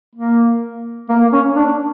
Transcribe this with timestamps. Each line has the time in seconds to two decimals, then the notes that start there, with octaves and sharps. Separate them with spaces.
0.16 A#3
1.09 A#3
1.33 C#4
1.56 D4